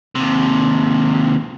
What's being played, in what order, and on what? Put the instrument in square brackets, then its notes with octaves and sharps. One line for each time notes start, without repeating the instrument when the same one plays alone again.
[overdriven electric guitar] D#2 C3